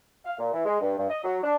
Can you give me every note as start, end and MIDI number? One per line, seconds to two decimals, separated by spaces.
0.25 0.37 77
0.39 0.51 46
0.53 0.62 52
0.65 0.77 56
0.81 0.95 43
0.97 1.08 43
1.09 1.21 75
1.23 1.37 54
1.43 1.55 62